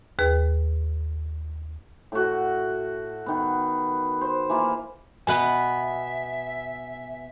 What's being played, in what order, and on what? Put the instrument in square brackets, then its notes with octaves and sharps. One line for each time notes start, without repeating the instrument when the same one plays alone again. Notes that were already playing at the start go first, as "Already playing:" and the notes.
[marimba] D#2 G#4 B4
[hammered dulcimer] A2 F#4
D#3 B3
C5
E3 A#3 F4
[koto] B2 B3 B4 [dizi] E5 [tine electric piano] G#5